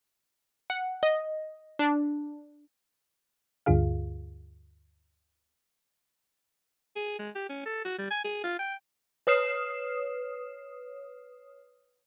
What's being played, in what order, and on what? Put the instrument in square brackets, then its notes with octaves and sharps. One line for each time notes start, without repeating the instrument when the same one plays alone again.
[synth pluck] F#5
D#5
D4
[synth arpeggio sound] D2 G2 D3 F4 G#4 F5
[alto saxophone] G#4
G#3
G4
C#4
A4
F#4
G3
G#5
G#4
F4
G5
[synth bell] B4 C#5 D#6 F6 C7 E7